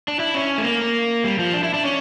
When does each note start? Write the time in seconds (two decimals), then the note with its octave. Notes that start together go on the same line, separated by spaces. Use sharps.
0.08 D4
0.20 E4
0.34 C#4
0.58 A3
0.64 A#3
1.24 G3
1.39 F3
1.54 D4
1.63 E4
1.74 D4
1.83 C#4